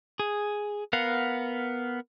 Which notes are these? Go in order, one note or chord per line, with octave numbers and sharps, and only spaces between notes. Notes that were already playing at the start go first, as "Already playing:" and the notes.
G#4
B3 A#4 F5 F#5